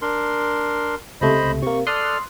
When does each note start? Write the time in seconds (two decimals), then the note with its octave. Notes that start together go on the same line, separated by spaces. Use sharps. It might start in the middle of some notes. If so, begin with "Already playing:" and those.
0.02 D4 A#4 C6
1.21 C#2 C3 A3 C5 D#5 B5
1.62 C3 A#3 C#6
1.87 A4 D5 C6 D#6 F6 F#6